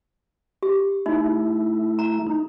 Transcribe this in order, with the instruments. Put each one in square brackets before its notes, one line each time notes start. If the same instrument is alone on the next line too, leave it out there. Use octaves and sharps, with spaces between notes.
[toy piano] G4
[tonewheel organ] A3 E4 [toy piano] D#4
[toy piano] A#5
[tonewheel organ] D#4